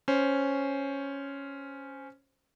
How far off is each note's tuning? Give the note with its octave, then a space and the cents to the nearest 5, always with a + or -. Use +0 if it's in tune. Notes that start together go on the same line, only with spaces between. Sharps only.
C#4 +0 C5 +0